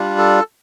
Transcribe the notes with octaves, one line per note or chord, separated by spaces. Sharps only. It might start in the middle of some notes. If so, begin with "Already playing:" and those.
Already playing: G3 D4 F4
A4